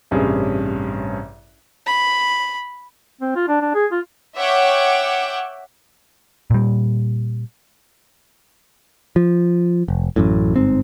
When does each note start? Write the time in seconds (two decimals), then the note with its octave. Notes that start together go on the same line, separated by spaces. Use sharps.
0.11 A1 G2 C3 C#4 G#4
1.86 B5
3.21 C4
3.36 F4
3.48 D4
3.61 D4
3.74 G#4
3.92 F4
4.35 C#5 E5 F#5 G5 D6
6.50 A#2 G3
9.16 F3
9.88 F1
10.16 A1 F#2 A2
10.56 G1 G#2 C4